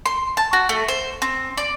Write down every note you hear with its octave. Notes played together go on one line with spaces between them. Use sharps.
C6
A5
F#4
A3
C5
C4
D5